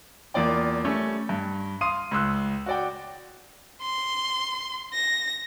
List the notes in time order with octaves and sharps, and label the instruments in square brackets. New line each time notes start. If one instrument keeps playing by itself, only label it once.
[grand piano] E2 A#3 F4 D5 G5
G3 A3 C#4
G2
F5 C6 D#6 D#7
C#2 C6 E6 F#6
F#4 D5 G5
[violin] C6
A#6